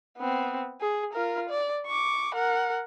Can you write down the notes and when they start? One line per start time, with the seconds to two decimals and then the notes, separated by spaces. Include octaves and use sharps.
0.18 B3 C4
0.81 G#4
1.13 F4 A#4
1.49 D5
1.87 C#6 D6
2.35 A#4 F#5